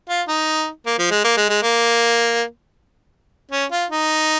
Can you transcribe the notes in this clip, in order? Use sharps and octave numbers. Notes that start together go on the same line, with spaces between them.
F4
D#4
A#3
F3
G#3
A#3
G#3
G#3
A#3
C#4
F4
D#4